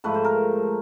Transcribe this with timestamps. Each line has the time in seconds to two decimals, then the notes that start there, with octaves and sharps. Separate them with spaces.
0.04 G#2 F3 A3 B4
0.14 C5
0.24 A#4